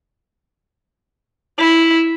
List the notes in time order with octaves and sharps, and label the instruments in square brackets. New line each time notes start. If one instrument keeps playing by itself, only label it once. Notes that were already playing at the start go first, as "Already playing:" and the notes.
[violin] E4